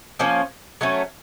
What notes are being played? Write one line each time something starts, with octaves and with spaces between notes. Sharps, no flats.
F3 A#3 C#4
F#3 A3 C#4